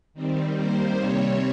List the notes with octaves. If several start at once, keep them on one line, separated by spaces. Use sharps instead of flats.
D#3 G3 C4
D#3 G3 A#3 C5
C3 G3 C4 C#5